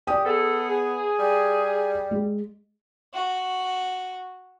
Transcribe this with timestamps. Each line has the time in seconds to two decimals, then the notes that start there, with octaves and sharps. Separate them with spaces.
0.07 G4 D5 D#6
0.25 B3 G#4 A4
0.68 G#4
1.19 G3
2.11 G#3
3.14 F#4